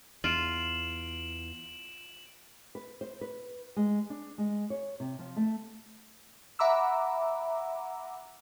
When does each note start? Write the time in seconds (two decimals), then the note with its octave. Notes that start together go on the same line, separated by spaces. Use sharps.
0.24 E2 F4 D7 E7 F#7
2.75 B4
3.01 C5
3.21 B4
3.76 G#3
4.10 D4
4.38 G#3
4.70 C#5
5.00 C3
5.19 F3
5.36 A3
6.59 E5 F#5 A#5 B5 D6 E6